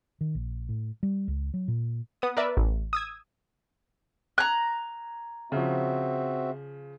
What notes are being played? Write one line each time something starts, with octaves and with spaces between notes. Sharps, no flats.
D#3
A#1
A2
G3
C#2
F#3
A#2
B3 D#6
A#4 B4 D5 E5
A1
D#6 E6 G#6
A#5 F#6 G#6
C#3 F3 C4 F#4 E5